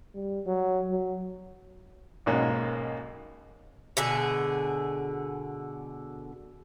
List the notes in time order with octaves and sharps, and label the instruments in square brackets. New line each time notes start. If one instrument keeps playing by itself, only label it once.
[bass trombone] G3
F#3
F#3
[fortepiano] B1 G#2 B2 A#3 C#4
[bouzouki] B2 D3 G#4